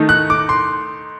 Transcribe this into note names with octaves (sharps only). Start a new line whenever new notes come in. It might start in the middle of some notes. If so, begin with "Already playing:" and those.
Already playing: D#3 A3 D#4
F#6
D6
C6